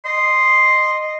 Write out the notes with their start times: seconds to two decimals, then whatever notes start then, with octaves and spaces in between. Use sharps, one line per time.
0.05 D#5 C6